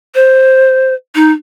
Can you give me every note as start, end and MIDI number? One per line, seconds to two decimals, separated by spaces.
0.15 0.94 72
1.15 1.32 63